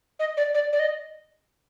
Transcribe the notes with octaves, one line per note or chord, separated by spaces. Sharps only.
D#5
D5
D5
D5
D#5